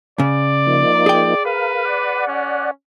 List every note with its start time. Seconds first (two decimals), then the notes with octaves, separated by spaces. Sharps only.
0.20 C#3 D5
0.67 F3 A#3 D#4
1.06 G#4 G5
1.45 A#4 B4 F5
1.85 D5 F#5
2.28 C#4